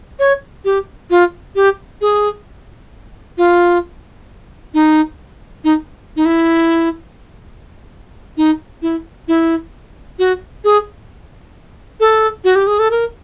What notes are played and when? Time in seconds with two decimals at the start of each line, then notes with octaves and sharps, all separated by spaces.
0.19 C#5
0.65 G4
1.10 F4
1.55 G4
2.01 G#4
3.38 F4
4.74 D#4
5.64 D#4
6.16 D#4
6.25 E4
8.37 D#4
8.82 E4
9.28 E4
10.19 F#4
10.64 G#4
12.00 A4
12.44 F#4
12.56 G4
12.67 G#4
12.79 A4
12.91 A#4